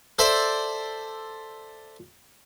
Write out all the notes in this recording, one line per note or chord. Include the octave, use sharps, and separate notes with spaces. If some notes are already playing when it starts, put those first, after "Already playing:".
A4 C5 D5 E5